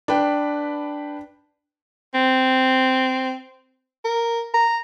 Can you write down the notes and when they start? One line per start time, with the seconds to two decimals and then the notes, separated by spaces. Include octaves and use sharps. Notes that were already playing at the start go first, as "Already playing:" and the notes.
0.08 D4 B4 G5
2.14 C4
4.05 A#4
4.54 A#5